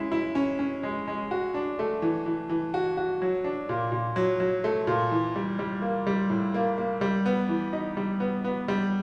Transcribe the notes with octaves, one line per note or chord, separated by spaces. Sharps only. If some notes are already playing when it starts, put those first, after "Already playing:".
Already playing: G#3 C#4 E4
E4
C#4
C#4
G#3
G#3
F#4
D4
A3
E3
E3
E3
F#4
F#4
F#3
D4
A#2
A#2
F#3
F#3
A3
A#2
E3
G3
G3
A#3
G3
A2
A#3
A#3
G3
B3
E3
D#4
G3
B3
B3
G3